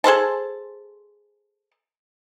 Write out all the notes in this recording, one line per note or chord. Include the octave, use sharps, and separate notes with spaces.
G#4 A4 C5 A5